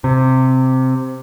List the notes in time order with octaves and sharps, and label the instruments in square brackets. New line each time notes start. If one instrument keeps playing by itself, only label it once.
[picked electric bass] C3